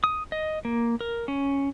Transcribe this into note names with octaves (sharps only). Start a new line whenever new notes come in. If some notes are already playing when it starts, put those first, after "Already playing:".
D#6
D#5
A#3
A#4
C#4